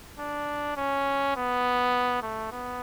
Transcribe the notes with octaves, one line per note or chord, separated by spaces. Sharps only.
D4
C#4
B3
A3
B3